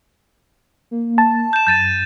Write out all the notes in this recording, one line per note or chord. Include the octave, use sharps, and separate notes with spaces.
A#3
A5
G6 E7
F#2 G6 A6 D#7